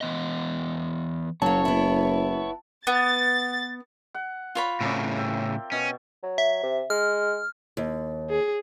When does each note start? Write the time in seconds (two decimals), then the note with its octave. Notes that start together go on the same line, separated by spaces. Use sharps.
0.01 E3 B3 D#5
1.42 F#1 F#3 A#3 C#5 A5
1.65 B3 E4
2.87 B3 A6
4.14 F#5
4.55 F4 C#5 B5
4.81 A2 C#3 C4 A#4 D5
5.17 E5 G5
5.72 B2 C#4
6.23 F#3
6.38 E5
6.63 C3
6.90 G#3 F6
7.77 D#2
8.30 G#4